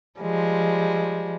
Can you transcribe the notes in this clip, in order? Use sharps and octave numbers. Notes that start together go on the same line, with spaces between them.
F3 G3 G#3